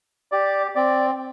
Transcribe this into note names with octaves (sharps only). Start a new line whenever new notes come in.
G4 D5
C4 D5